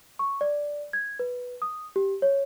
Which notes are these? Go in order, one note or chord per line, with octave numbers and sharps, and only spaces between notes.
C#6
D5
G#6
B4
D#6
G4
C#5